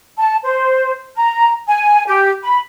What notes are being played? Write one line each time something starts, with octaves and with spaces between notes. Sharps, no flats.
A5
C5
A#5
G#5
G4
B5